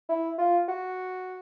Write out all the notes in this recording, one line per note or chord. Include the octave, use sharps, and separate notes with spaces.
E4
F4
F#4